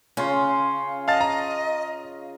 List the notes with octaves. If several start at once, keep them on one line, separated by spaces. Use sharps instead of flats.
C#3 C#4 F4 C6
D#5 F5 A5 A6
A#5